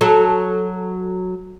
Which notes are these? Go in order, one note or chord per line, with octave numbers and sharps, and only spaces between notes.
F#3 A4